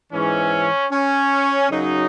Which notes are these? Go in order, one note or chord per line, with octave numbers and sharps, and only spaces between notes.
G#2 E3 C#4
C#4
F#2 C#3 F#3 D#4